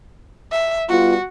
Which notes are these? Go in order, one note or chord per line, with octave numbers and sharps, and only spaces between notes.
E5
G3 B3 F4 F#4